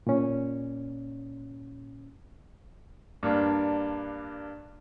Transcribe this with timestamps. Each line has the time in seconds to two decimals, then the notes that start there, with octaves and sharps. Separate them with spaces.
0.07 A#2 C#4
3.23 G2 A#3 D4